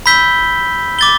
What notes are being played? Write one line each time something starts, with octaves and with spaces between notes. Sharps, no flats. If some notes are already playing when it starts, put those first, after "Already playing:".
B5 E6 G6 B6 G7
D6 A6 G7